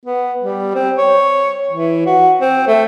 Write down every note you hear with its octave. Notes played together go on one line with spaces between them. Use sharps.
B3
G3
C4
C#5
E3
F#4
C4
A3